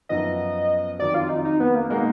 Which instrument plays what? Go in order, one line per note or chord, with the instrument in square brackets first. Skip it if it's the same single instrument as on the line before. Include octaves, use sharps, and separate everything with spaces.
[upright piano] F#2 F3 B3 [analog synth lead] D#5
[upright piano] F2 D#3 F#3 [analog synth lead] D5
[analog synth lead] F4
D#4
D#4
B3
A#3
[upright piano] B2 G#3 D#4 F#4 [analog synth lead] A#3